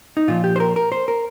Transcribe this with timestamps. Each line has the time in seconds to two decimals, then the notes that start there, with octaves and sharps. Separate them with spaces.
0.17 D#4
0.28 A#2 F3 F4
0.44 G4
0.56 C5
0.60 A#4
0.76 A#4
0.92 C5
1.08 A#4